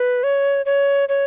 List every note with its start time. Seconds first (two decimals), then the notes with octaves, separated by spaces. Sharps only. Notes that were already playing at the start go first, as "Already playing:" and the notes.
Already playing: B4
0.23 C#5
0.66 C#5
1.09 C#5